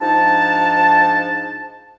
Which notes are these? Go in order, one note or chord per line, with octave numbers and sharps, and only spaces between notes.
G#2 F3 D4 D#4 A5